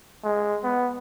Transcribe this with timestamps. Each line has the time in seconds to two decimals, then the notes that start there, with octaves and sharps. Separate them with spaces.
0.24 G#3
0.63 B3